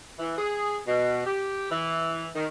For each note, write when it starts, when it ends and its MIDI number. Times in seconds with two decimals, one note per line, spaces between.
0.19 0.33 52
0.37 0.78 68
0.86 1.21 47
1.25 1.65 67
1.69 2.27 52
2.35 2.45 51